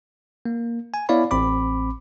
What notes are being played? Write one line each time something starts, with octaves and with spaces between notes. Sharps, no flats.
A#3
G#5
B3 E4 C#5 D5 F5 B5
A1 C4 B5 D6